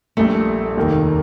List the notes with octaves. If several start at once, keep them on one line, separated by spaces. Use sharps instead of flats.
A#1 A#2 G3 A3
F1 D#2 D#3 A#3